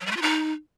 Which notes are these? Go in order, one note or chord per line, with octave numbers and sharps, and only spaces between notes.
F#3
G3
A3
F4
D#4